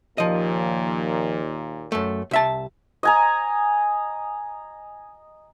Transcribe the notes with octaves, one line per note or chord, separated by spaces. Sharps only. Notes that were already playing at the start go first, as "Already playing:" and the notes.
D#2 A#2 F3 D#5
F#2 A3
C2 E5 A5
D#5 G#5 A#5